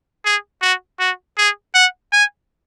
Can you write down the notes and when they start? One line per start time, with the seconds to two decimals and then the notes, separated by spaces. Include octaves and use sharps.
0.25 G#4
0.62 F#4
0.99 F#4
1.38 G#4
1.75 F#5
2.12 G#5